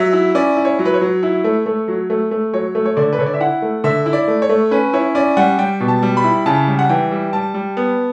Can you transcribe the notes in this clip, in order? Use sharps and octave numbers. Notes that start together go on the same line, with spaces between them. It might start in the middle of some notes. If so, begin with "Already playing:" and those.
Already playing: F#3 E5
E4
C#4 D5
E4
C#5
F#3
B4
C#5
F#3
E4
A3
A3
F#3
A3
A3
F#3 C#5
A3
C#5
D3 D5
B4
D3 C#5
D5
E5
E4 F#5
A3
D3 E5
E4
D5
A3
C#5
A3
C#4 B4
E4 C#5
C#4 D5
G3 F#5
G3 G5
B2
A5
G3
B5
E4
C#3 A5
G3
F#5
E3 G5
G3
G3 A5
G3
B3